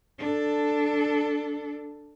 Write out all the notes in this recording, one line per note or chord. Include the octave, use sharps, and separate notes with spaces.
D4 A4